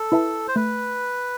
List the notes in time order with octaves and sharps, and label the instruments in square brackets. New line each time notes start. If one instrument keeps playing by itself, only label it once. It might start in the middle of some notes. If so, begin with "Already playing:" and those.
Already playing: [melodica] A4
[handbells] E4 B4 E5 A5
[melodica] C5
[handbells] A3 [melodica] B4